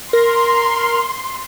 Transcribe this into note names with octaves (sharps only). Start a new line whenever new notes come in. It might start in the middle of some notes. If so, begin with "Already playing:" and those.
A#4 C6